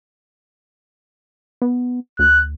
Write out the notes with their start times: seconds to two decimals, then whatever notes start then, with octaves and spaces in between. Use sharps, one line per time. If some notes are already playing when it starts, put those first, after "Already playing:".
1.62 B3
2.19 D2 F#6